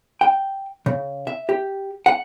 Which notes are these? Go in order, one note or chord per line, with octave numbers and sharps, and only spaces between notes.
G5
C#3
E5
G4
F#5